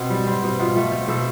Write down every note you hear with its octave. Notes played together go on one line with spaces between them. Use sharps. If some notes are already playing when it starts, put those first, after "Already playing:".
Already playing: B2 C4
G3
C4
B2
B2 F4
A3
C4
B2 A4